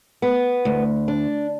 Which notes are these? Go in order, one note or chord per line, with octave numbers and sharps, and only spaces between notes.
B3
D2
D4